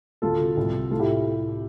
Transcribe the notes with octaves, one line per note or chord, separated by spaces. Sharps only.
D2 F4 A4
C3
C2
C3
A2 F4 A4
E4 G4